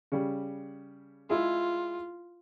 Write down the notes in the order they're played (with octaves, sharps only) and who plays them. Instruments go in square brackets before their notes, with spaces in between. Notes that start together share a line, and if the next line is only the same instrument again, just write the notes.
[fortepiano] C#3 G3
[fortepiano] G#3 E4 G#4 [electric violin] F4